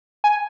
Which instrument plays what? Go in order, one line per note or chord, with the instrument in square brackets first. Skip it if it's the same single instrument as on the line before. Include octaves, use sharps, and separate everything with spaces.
[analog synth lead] G#5